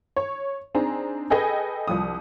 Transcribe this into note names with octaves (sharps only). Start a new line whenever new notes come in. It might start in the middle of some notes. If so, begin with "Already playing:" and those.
C#5
C4 D4 D#4 G#4 A#5
G#4 A4 B4 D#5 G5 G#5
C2 F3 D#6